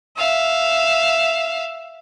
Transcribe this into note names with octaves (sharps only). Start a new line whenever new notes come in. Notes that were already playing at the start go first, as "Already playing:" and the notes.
E5 F5